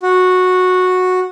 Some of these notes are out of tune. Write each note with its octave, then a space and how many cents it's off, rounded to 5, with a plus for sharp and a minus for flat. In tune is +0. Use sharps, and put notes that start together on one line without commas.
F#4 -10